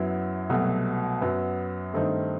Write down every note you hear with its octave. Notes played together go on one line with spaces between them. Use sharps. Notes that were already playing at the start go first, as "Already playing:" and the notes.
Already playing: F#2 F#3 B3 E4
C2 B2 F#3 A3
F#2 F#3 B3
G2 D#3 A3 C4 D#4